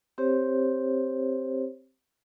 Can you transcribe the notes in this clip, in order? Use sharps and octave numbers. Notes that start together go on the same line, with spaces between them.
C4 G4 C5 C#5